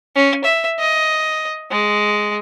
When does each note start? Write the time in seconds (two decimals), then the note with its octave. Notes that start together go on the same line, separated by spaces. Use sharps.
0.15 C#4
0.44 E5
0.79 D#5
1.71 G#3